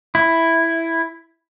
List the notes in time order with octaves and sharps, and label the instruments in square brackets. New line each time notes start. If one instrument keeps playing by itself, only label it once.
[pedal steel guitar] E4